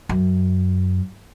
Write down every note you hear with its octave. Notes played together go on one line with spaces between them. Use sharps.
F#2